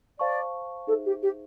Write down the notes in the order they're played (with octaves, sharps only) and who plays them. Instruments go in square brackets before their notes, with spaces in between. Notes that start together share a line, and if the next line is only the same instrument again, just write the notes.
[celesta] C5 F5 A5 C#6 [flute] D5
[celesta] D#4 G#4 C5 E5 [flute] A4
[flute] G4
G4